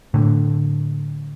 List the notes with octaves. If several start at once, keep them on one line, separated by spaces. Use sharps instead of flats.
A2 D3